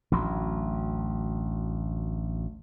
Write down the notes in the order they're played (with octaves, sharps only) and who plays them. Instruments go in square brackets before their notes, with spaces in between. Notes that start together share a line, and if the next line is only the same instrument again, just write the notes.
[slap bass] A1 D2 F#3